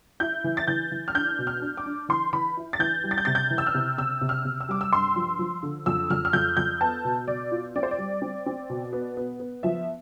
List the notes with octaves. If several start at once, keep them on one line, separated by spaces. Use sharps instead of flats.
E4 G6
E3
A6
E3 G6
E3
F6
D4 G6
B2
F6
D4
D6
D4
E3 C6
E3 B5
E4
A6
E3 G6
G3
A6
G6
C3 A6
G6
E3
E6
F6
C3
C3 E6
C3
F6
C3
E6
G3 D6
E6
G2 C6
F3
F3
D3
F2 E6
F2 F6
F6
F2 G6
F2 G6
B3 A5
B2
B2 D5
F4
C4 D5
C5
D5
G3
C4
C4
B2
B3
B3
B3
F3 E5